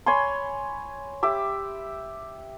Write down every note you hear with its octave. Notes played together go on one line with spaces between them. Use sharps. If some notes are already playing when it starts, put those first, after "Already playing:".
C#5 G#5 B5 C6
G4 E5 D6